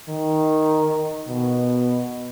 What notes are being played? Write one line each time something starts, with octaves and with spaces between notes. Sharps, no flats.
D#3
B2